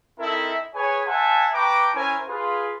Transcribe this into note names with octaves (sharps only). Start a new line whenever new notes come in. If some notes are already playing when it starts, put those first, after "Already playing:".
C4 D#4 E4 A4 A#4 E5
G#4 B4 C#5 G#5
C5 E5 F#5 G#5 A5
B4 G5 A5 A#5 C#6 D6
C#4 E4 A#4 C5 G#5
F4 G#4 B4